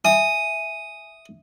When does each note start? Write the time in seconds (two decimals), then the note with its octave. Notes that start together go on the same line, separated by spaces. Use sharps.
0.05 E5 G#5 D#6